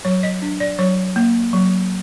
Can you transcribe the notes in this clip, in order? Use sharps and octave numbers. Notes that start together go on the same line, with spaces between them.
F#3 C#5
D#5
D4
D5
F#3 C#5
A#3
F#3